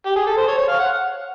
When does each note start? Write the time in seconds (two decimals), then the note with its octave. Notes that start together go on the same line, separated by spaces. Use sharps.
0.06 G4
0.16 G#4
0.27 A4
0.37 C5
0.48 C#5
0.58 C#5
0.68 F5
0.79 F#5